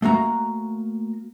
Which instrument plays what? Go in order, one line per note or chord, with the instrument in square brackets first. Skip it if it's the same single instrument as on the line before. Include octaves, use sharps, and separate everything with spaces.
[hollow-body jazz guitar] A3 A#3 F#4 A#5